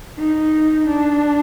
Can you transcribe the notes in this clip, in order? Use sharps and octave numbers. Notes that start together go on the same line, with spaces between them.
D#4
D4